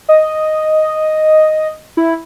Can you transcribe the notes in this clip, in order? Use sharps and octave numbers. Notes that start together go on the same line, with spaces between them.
D#5
E4